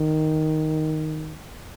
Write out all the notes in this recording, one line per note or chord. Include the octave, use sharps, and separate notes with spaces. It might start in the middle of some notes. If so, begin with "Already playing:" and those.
Already playing: D#3